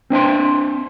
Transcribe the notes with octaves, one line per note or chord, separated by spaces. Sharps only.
C4 D4 E5 C6